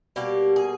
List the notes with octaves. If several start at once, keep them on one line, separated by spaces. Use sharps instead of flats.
B2 G3 A#3 G4
G#4